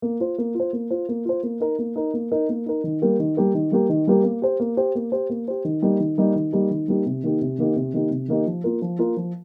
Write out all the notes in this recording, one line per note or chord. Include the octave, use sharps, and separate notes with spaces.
A#3
F4 C5
A#3
F4 C5
A#3
F4 C5
A#3
F4 C5
A#3
D#4 A#4
A#3
D#4 A#4
A#3
D#4 A#4
A#3
D#4 A#4
D#3
G3 A#3 G4 A#4
D#3
G3 A#3 G4 A#4
D#3
G3 A#3 G4 A#4
D#3
G3 A#3 G4 A#4
A#3
G4 C5
A#3
G4 C5
A#3
G4 C5
A#3
G4 C5
D#3
G3 A#3 D#4 G4
D#3
G3 A#3 D#4 G4
D#3
G3 A#3 D#4 G4
D#3
G3 A#3 D#4 G4
C3
D#3 A#3 D#4 G4
C3
D#3 A#3 D#4 G4
C3
D#3 A#3 D#4 G4
C3
D#3 A#3 D#4 G4
F3
A#3 F4 A#4
F3
A#3 F4 A#4
F3